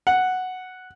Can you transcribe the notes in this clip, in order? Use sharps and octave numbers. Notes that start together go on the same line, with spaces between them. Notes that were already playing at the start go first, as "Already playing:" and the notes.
F#5